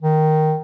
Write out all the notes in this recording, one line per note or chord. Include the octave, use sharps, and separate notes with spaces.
D#3